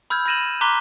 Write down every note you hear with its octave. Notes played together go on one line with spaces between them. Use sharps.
B5 E6 F6 G6 G#6
B5 G#6 A#6 D#7 E7 F#7
A#5 C6 D6 F#6 B6 G7